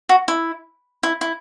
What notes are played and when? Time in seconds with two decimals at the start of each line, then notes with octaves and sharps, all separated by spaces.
0.09 F#4
0.28 E4
1.03 E4
1.21 E4